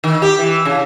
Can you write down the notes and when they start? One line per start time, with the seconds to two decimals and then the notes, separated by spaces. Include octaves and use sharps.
0.04 D#3
0.22 G4
0.39 E3
0.65 C#3